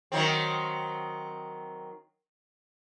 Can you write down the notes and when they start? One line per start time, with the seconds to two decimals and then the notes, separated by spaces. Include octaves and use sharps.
0.12 D#3 F#3 C4